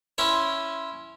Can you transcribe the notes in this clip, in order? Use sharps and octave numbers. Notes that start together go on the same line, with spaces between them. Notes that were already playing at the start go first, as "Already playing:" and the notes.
C#4 E4 C5 C#5